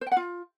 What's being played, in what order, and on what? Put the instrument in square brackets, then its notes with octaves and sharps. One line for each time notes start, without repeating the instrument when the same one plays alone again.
[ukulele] C5
G5
F#5
F4